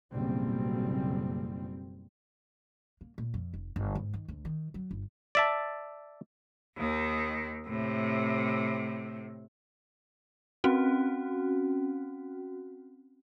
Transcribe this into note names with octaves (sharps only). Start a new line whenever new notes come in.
F#1 B1 A2 G3 C4
A#3
A#2
F2
F1
G1
G#2
D#3
D2
D#3
F#3
G1
D5 E5 A5
D#2 D#3
A2 C3
C4 C#4 F#4